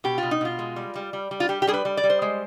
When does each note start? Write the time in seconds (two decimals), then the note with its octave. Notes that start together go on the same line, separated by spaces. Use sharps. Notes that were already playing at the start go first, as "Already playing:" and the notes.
0.04 B2 G4
0.18 B2 F4
0.31 D#4
0.41 B2 F4
0.59 G#3
0.76 G3
0.95 G3
1.13 G3
1.31 G3
1.40 F4
1.49 G3 G4
1.62 G4
1.67 G3 G#4
1.74 B4
1.85 G3
1.97 D5
2.04 G3
2.10 C5
2.22 G#3